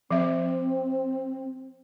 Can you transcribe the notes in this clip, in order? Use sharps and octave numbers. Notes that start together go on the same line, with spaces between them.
F3 C4 E5